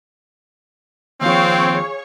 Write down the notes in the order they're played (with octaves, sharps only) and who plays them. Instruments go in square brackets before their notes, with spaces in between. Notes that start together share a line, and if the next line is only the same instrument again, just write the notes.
[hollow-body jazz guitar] D#2 F3 [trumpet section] C4 [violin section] G#4 C#5 C#6 [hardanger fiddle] F5